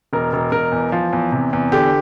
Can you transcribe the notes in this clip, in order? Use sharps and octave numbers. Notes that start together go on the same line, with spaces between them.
E1 A#4
E1
E1 A#4
E2
F3
E2
C3
E2
D3 G4